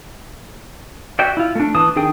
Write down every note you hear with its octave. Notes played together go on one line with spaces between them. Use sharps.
F#4 D5 E5 G5
E4 F4
A3 D4
E3 A5 D#6
D#3 D4 G#4 G5 D#6